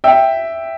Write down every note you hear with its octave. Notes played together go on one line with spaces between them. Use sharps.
E5 G5